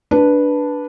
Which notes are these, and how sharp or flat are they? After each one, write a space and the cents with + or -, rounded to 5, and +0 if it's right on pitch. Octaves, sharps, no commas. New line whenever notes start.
D4 +0 B4 -10